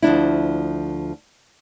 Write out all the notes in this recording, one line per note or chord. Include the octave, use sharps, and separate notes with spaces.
D2 F3 D4 E4